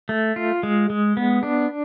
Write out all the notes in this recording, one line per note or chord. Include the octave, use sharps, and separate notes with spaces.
A3
F4
G#3
G#3
B3
D4